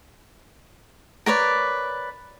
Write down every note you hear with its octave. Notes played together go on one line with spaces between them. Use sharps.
A#4 B4 C#5 D5